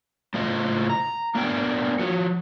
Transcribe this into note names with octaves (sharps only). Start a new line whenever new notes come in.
A2 C#3 F4 C5 D#5
A#5
A#3 B3 D4 A#4 G5 G#5
F3 F#4